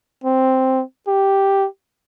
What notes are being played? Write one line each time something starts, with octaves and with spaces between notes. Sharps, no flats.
C4
G4